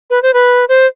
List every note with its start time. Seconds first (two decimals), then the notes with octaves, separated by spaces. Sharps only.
0.10 B4
0.22 C5
0.34 B4
0.69 C5